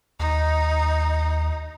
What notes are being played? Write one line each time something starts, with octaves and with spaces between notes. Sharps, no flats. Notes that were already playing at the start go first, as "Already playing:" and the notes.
D#2 D#4